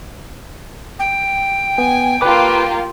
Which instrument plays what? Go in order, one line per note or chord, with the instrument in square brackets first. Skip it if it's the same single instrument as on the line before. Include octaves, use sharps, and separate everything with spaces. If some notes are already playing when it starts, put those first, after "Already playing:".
[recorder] G5
[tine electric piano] B3 [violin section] G#5
[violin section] A#3 F4 G4 [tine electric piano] B4 D6